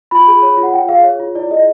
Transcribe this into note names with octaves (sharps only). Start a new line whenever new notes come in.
F4 B5
G#4
C#5
F4
F#5
F4 G5
G#4 F5
C#5
F4
E4 D5
G#4 D#5